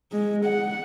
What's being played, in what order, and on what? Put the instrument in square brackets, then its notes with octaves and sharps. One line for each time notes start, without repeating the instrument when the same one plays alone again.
[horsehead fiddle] G#3
F#5